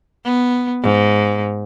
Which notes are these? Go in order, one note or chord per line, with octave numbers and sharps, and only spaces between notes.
B3
G#2